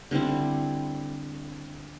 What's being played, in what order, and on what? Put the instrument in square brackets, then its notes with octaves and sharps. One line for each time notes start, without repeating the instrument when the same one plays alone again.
[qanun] D3 G3 C4 E4